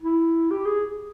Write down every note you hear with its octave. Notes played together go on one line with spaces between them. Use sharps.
E4
G4
G#4